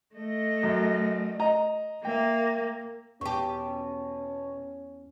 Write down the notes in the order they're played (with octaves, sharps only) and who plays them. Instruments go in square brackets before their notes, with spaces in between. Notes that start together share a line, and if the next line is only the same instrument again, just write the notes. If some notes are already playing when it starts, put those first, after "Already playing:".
[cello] A3 D#5
[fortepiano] F#2
D#5 A#5
[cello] A#3 [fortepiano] E5 G5
[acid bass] E2 [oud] B2 G4 [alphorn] C#4 [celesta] A5 C#6